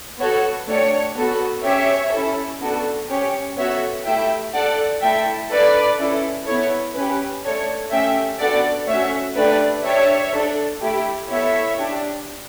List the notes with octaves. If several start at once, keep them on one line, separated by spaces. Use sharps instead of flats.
B3 F#4 A4 C#5
A3 D4 G4 C#5
B3 F#4 A4
C#4 G4 C#5 E5
C#4 E4 A4
B3 D4 F#4 A4
C#4 G4 C#5
B3 F#4 A4 C#5 E5
A3 E4 G4 E5 G5
D4 A4 D5 F#5
A3 E4 A4 E5 G5
D4 A4 B4 D5
C#4 E4 A4
B3 E4 A4 C#5
C#4 G4 B4
A3 D4 A4 C#5
A3 C#4 G4 E5 G5
B3 D4 F#4 A4 D5 F#5
A3 C#4 F#4 C#5 E5
A3 D4 G4 B4 D5
D4 G4 C#5 E5
D4 A4
A3 E4 G4
B3 E4 A4 C#5 E5
D4 G4